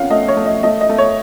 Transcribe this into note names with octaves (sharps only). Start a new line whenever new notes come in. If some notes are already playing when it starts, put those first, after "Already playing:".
Already playing: F2 C#4 F5 F#5
A3 D#5
C#5
A3
D#5
A3 D#5
D#5
A3
C#5